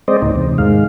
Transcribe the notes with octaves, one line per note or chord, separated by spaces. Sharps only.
G#3 C4 C5 D5 D#5
D2 A2 D#4
E2 C3
G#2 D#3 G#3 F5